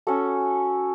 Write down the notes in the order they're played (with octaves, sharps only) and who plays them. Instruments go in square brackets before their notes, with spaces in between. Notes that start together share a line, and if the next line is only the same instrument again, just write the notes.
[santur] C#4 F#4 A4